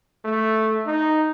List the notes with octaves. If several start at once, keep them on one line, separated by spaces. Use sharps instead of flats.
A3
D#4